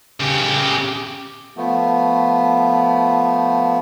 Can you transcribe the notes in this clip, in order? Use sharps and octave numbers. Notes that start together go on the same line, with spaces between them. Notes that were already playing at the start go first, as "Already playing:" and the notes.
C#3 G4
F3 A3 B3